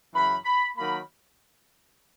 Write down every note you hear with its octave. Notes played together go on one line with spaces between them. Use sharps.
F#2 C#3 E3 B5
B5
D#3 F#3 A#3 B5